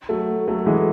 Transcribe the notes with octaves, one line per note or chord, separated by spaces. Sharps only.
F#3 A3
F#3 A3
E3 G#3